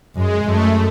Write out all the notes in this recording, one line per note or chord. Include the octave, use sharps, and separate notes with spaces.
F#2 G#3
F#2 A3